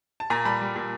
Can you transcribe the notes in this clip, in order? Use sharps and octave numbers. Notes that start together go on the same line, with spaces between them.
A5
A#2 G#5 A#5
G3 A5 B5
G3
A#2